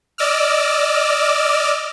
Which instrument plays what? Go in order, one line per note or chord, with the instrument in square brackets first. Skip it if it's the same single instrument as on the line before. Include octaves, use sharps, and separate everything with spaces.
[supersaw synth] D5 D#5 D6 E6 F6